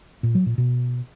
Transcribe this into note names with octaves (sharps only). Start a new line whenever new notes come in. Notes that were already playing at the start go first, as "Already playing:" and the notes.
A#2
F#3
A#2
B2